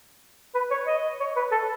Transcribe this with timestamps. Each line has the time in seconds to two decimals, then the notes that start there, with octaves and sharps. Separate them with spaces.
0.54 B4
0.71 C#5
0.87 D#5
1.20 C#5
1.36 B4
1.51 A4